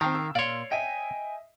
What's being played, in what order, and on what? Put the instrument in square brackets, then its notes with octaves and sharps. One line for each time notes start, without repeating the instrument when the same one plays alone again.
[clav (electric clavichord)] D#3 [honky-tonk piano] C4 G5 A5 [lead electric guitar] A#4 F5
[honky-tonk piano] E6
[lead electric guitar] A#2 C6 [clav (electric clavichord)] C#5 D5 [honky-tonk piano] F5 C7
[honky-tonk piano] D#5 E5 [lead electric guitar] G5 G#5